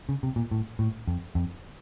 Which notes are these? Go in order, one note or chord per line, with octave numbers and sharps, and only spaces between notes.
C#3
C3
A#2
A2
A2
F2
F2